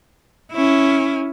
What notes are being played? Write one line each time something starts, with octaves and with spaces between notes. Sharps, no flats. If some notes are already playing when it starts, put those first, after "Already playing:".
C#4 E4